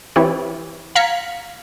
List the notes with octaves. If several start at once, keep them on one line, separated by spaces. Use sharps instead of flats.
E3 C4 E4 G4 C#5
F5 A#5 G#6 B6 C#7